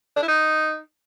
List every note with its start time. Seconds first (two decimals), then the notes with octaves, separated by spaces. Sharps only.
0.16 D4
0.22 E4
0.28 D#4